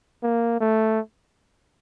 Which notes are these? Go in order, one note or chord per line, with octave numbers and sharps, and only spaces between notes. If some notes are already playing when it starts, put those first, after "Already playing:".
A#3
A3